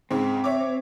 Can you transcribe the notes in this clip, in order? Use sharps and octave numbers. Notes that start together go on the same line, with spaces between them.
G#2 C#3 C4
C#5 E5 D6